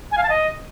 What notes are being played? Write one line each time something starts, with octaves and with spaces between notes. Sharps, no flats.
G#5
F5
A5
D#5